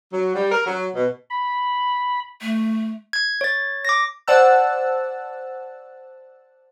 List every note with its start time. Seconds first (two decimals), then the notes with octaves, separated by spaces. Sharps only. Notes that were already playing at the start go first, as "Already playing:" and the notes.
0.12 F#3
0.34 G3
0.52 A#4
0.67 F#3
0.95 B2
1.30 B5
2.41 A3
3.13 G#6
3.41 C#5 A6
3.85 D6 A#6
4.27 C5 D5 F#5 A5 E6